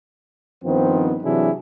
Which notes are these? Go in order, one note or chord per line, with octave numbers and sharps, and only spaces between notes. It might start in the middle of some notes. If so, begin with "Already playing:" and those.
G2 D#3 F3 B3 C4
C3 E3 F#3 D4 E4 G#4